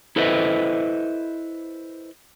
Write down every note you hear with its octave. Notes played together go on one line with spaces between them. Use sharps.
E4 A4 B4 C5 D#5 E5